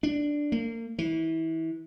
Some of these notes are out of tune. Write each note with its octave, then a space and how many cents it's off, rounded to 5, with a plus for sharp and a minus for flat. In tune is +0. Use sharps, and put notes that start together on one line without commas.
D4 +0
A#3 -35
E3 -25